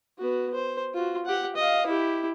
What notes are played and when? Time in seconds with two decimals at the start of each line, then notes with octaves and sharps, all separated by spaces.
0.18 B3 F#4
0.54 C5
0.94 F4 F#4
1.26 G4 F#5
1.56 D#5 F5
1.87 E4 G4